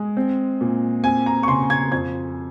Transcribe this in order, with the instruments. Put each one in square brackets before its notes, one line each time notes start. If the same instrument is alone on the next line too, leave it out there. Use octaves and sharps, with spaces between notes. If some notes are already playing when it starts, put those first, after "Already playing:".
Already playing: [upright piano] G#3
C4
A#2
C4 G#5
A#5
C#6
C#3 C6
G#6
F2 G#6